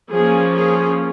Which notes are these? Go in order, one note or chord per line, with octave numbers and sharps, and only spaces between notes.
F3 A#3 C#4 G#4
G#4